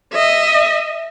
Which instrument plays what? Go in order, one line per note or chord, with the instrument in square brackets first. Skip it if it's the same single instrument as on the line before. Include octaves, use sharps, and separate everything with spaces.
[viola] D#5 E5